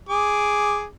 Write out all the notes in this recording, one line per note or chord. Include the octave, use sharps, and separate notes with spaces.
G#4 D6